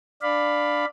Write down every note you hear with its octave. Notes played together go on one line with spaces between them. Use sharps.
D4 D5 F5 B5